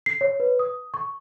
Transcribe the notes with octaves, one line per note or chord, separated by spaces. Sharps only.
C7
C#5
B4
D#6
C#6